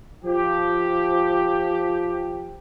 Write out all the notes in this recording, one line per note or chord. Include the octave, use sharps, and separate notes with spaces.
F3 G4